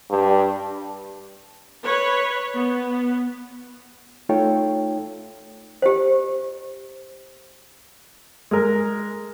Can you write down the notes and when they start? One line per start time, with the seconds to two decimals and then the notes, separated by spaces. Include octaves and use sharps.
0.10 G2
1.84 B4 C#5
2.54 B3
4.29 A3 D#4 F4 A4 C#5 G5
5.82 G4 C5
8.51 G#3 A#4